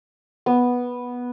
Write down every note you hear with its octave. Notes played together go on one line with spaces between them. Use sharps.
B3